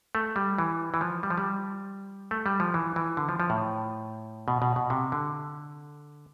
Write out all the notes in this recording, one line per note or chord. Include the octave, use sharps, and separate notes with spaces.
A3
G3
E3
E3
F3
G3
F3
G3
A3
G3
F3
E3
E3
D3
F3
F3
A2
B2
B2
B2
C3
D3